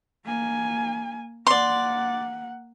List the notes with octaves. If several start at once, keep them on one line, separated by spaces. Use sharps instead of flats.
A#3 G#5
A#3 D5 F#5 C6